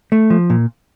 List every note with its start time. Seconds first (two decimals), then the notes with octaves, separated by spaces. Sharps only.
0.12 A3
0.30 F3
0.50 A#2